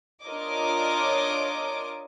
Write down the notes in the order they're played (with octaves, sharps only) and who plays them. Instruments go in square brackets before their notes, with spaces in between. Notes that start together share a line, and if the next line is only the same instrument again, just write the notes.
[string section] D4 F4 A#4 C#5 D#5 D6